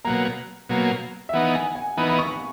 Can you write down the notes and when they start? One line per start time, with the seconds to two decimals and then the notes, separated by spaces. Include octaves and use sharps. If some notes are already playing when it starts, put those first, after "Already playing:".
0.05 B2 F#3 A#3 A#5
0.69 B2 F#3 A#3
1.29 E5
1.33 E3 B3 D#4 F#5
1.55 G#5
1.75 G#5
1.97 E3 B3 D#4 B5
2.09 B5
2.19 C#6